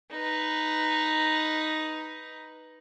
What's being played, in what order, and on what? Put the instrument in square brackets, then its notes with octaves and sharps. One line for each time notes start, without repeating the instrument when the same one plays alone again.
[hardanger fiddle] D#4 B4